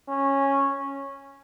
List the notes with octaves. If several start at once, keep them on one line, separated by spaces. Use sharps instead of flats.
C#4